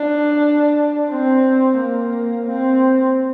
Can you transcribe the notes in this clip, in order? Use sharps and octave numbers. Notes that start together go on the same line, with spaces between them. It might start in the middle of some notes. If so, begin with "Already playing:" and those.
Already playing: D4
C4
A#3
C4